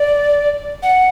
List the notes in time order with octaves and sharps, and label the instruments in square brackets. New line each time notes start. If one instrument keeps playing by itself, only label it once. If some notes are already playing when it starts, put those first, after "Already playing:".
Already playing: [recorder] D5
F#5